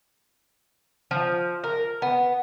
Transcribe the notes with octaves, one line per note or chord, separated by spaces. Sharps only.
F3
A#4
B3